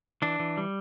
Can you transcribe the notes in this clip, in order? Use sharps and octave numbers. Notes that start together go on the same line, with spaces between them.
E3 D4
E3
G3